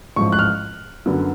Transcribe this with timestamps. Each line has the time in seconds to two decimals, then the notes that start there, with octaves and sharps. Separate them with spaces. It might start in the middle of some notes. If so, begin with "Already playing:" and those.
0.16 A1 G#2 F3 C#6
0.32 F#6
0.39 F6
1.06 F#2 D3 F#3 B3